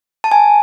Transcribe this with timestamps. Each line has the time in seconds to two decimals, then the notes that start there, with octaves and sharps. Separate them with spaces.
0.24 A5
0.32 G#5